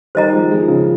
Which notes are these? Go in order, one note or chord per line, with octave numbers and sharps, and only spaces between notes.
D#3 G3 C5 D#5 A#5
F3 G#3
F3 G#3
C#3 F3